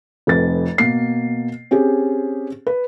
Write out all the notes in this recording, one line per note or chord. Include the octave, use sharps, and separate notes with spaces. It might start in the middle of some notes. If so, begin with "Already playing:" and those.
F1 F2 B4 A6
B2 A#3 C7
C4 C#4 G4 G#4
B4